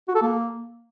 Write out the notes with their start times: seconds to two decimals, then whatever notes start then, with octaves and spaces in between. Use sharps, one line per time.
0.08 F#4
0.15 A4
0.22 A#3